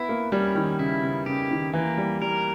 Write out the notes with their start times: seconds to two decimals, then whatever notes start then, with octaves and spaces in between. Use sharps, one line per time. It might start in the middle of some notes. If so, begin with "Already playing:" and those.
Already playing: B3 E4
0.09 A#3
0.32 G3 C#4
0.55 D#3
0.79 C#3 E4
1.03 C#3
1.26 C#3 G4
1.51 D#3
1.74 E3 A#3
1.98 G3
2.21 G3 A#4